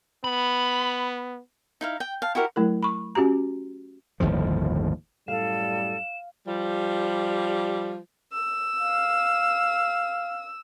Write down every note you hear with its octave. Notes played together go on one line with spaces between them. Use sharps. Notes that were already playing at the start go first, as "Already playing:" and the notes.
B3 B5
D#4 E4 F5
G5
F5 A5
E4 F#4 G4 A#4
F#3 A3 E4 A#4
B5 C#6
C#4 F#4 G4 A#5
G1 D#2 A2 F3
F#2 A2 G3 A4 F5 E7
F3 G3
E6
F5